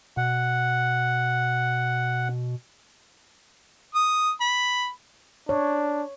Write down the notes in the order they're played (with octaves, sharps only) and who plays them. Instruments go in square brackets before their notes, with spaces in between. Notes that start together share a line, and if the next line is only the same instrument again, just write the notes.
[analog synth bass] B2 [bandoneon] F#5
[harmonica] D#6
B5
[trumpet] D4 [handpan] C#5